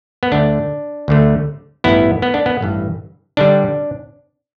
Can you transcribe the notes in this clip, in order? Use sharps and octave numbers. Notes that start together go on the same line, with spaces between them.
B3
D2 D3 A3 D4
D2 D3 A3
A1 G2 E3 B3 E4
B3
D4
B3
A1 G2 E3
D3 G3 D4